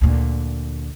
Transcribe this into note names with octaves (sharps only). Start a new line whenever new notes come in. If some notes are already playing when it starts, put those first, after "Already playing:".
D2 A#2